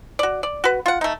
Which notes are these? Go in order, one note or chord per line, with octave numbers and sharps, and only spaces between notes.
F#4 D5
D5
F#4 B4
F4 F#5
A3 D#4